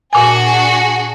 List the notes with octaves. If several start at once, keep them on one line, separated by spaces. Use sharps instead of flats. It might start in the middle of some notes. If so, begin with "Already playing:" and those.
A#2 D4 F#4 G#4 G#5